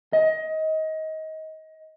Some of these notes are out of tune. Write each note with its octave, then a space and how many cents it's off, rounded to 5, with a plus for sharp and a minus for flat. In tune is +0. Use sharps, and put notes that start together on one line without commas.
D#5 +25